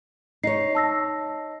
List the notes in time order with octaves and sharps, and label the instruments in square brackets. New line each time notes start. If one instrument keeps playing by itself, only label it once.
[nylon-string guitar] D#4 C#5 [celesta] C7
[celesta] A5 E6 A#6